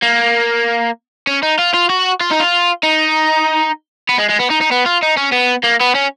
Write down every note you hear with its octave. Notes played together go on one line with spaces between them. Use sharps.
A#3
C#4
D#4
F4
F4
F#4
F4
D#4
F4
D#4
B3
G#3
G#3
B3
D#4
D#4
B3
F4
D#4
C#4
B3
A#3
B3
C#4